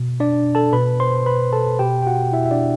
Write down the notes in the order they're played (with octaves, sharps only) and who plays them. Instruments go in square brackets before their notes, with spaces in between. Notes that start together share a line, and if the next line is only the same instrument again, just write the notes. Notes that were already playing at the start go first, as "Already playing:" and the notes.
Already playing: [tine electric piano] B2
D4 D5
A4 A5
B2 B4 B5
C5 C6
B4 B5
A4 A5
B2 G4 G5
G5
F#4 F#5
E4 E5
E5
D4 D5